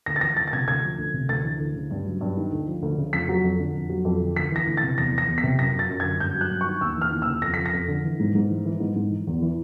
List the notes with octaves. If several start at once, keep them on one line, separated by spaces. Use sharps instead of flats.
D2 A#6
A6
E3 A#6
D2 A6
A6
C3 G#6
D2 G#6
F3
D2
C3
D2 A6
E3
D2
C#3
G2
F#3
G2
D#3
D2
F3
D2
C#3
F2 B6
F#3
F2
D3
F2
F#3
F2
D3
D2 B6
E3 A#6
D2
A6
C3
E2 A#6
E3
A#6
E2
B6
C3
F#2 A#6
F#3
A6
F#2
G#6
D3
G2 G6
F#3
F#6
G2
D#3 C#6
D#2 E6
E3 F6
D#2
E6
C#3
F2 A#6
F3 B6
A#6
F2
D3
E3
G#2
G#2
E3
E3
G#2
G#2
E3
E2
E3